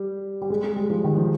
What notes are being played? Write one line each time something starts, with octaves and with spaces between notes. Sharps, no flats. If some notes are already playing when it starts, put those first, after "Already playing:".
Already playing: G3
G3
G#3
G#3
G3
F3
D#3
F3